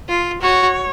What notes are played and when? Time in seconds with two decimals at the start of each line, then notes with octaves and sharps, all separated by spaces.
0.09 F4
0.42 F#4 C#5